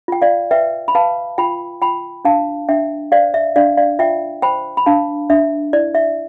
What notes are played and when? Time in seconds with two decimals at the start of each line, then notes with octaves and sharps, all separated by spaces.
0.08 F4 G5
0.22 D5 F5
0.51 B4 E5 G5
0.88 B5
0.95 B4 F5 A5
1.38 F4 G5 B5
1.82 F4 G5 B5
2.25 D4 F5 A5
2.69 D4 E5 G5
3.12 C5 D5 F5
3.34 E5
3.56 D4 D5 F5
3.77 D5 F5
3.99 F4 E5 G5
4.42 C5 G5 B5
4.77 B5
4.86 D4 F5 A5
5.30 D4 E5
5.73 E4 D5
5.95 E5